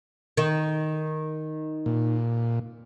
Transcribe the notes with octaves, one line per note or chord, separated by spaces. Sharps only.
D#3
A#2